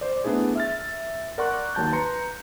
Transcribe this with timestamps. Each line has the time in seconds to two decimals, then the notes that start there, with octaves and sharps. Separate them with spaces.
0.01 C5 D5
0.24 A3 B3 D4 E4 G#4
0.55 E5 F6 A6
1.38 A#4 D5 F#5 C6 C#6 F#6
1.75 D#2 F#3 A5 G6
1.92 B4 A#5 C6 C#7